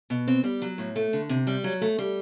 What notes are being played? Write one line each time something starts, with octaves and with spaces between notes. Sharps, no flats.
B2
C4
G3
F#3
A2
A3
D3
C3
G3
F#3
A3
G3